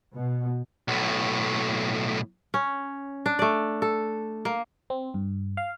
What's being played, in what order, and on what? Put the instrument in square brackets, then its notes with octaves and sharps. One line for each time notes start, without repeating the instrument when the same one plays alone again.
[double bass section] B2
[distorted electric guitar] B1 A2
[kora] C#4
D4
A3 D5
A4
A#3
[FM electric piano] C4
G2
F5